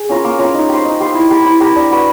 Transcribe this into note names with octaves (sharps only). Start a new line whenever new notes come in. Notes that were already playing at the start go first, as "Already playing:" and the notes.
Already playing: G#4
C#4 F4 A#4
A#3
C#4 F4 A#4
D#4
G4 C5
D#4
G4 C5
E4
G4 A#4
E4
G4 A#4
D4
F#4 B4